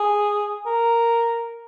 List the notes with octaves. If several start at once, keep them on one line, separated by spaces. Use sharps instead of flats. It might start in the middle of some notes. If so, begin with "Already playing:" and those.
Already playing: G#4
A#4